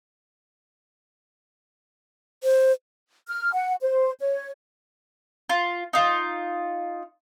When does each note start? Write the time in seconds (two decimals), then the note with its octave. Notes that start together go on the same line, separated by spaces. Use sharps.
2.44 C5
3.28 F6
3.53 F#5
3.82 C5
4.20 C#5
5.49 F4
5.93 D#4 F4